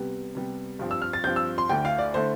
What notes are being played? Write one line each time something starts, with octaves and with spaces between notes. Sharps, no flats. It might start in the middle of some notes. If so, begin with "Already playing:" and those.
Already playing: C3 G3 B3
C3 G3 B3
G2 F3 C4
E6
F6
A6
G2 F3 C4 G6
E6
C6
D2 D3 A3 E4 G5
F5
D5
D3 A3 E4 C5